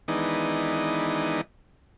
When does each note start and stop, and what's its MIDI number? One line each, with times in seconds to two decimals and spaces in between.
0.08 1.41 51
0.08 1.41 52
0.08 1.41 56
0.08 1.41 59
0.08 1.41 62
0.08 1.41 63